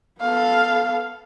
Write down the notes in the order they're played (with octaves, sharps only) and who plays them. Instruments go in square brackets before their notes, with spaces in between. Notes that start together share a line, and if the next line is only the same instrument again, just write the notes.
[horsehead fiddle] B3 A4 [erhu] F5